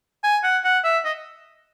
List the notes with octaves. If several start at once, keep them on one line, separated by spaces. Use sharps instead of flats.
G#5
F#5
F#5
E5
D#5